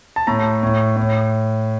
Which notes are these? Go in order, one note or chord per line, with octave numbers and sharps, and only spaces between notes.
A5
A2 A#5
A2
A2